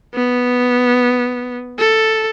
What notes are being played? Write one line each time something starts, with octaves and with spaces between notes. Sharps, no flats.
B3
A4